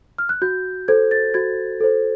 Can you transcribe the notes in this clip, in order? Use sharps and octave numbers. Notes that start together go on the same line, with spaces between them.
F6
F#6
F#4 G6
A4 C5 G#6
A6
F#4 G#6
A4 C5